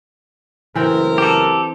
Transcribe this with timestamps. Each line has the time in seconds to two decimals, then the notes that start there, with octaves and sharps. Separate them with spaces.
0.75 F#1 E3 A3 C4 A#4 G5
1.18 G4 A4